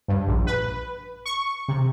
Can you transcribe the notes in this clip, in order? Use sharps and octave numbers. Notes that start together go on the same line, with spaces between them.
G2
A#1
B4
C#6
C3